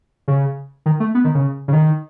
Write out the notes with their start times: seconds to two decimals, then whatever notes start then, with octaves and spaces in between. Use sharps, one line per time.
0.28 C#3
0.86 D#3
1.00 A3
1.15 B3
1.25 D#3
1.35 C#3
1.68 C#3
1.73 D#3